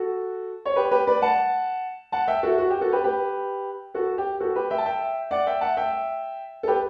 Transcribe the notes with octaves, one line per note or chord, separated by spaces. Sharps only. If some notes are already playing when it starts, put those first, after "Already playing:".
Already playing: F#4 A4
C#5
G4 B4
G4 B4
B4 D5
F#5 A5
F#5 A5
E5 G5
F#4 A4
F#4
G4
F#4 A4
G4 B4
G4 B4
F#4 A4
G4
F#4 A4
G4 B4
E5 G5
A5
E5 G5
D5 F#5
E5 G5
F#5 A5
E5 G5
A4
G4 B4